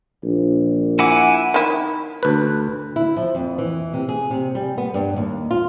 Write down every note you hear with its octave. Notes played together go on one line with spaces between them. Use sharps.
A#1
E4 F#5 G#5 D6
D#3 E4
D2 B4
E4
F3
F2
E3
C3
G#4
C3
G3
B3
G2
D#2
F4